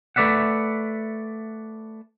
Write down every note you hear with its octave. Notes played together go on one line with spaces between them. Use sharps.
A3 B4 D5 E5 F#5